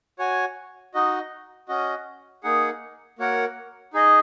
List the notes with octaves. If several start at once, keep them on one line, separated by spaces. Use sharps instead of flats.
F#4 C#5 G#5
D#4 F#4 D#5
C#4 F#4 D#5
A#3 D#4 G#4 F#5
A#3 F#4 A#4 C#5 F#5
D#4 G#4 D#5